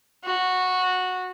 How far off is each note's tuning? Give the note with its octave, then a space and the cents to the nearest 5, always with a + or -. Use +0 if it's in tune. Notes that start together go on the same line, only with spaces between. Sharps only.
F#4 -10